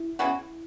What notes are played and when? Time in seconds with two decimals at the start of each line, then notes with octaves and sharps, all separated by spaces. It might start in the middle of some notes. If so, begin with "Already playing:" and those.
Already playing: E4
0.19 C#3 E3 B3 F#4